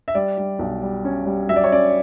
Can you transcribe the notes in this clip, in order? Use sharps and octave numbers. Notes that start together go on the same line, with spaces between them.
E5
G3 D5
G3
B1
G3
C#4
G3
F#3 E5
D5
C#5
C#4 D5